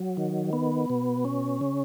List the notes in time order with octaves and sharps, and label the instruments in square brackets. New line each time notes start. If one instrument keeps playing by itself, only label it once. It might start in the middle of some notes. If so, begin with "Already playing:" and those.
Already playing: [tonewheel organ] F#3
D#3
B3
B2
C#4
C#3